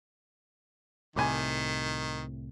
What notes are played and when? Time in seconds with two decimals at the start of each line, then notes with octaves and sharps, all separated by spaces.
1.16 C2 A2 C3 D#3 G#5 B5 D6